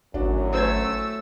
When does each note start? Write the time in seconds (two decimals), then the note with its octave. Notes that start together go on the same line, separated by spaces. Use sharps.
0.14 G#1 F#2 A2 D4 F#4
0.52 A3 C#4 C5 E6 G#6